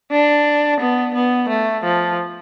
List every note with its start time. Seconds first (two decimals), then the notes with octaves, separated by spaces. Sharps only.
0.11 D4
0.80 B3
1.14 B3
1.49 A3
1.84 F3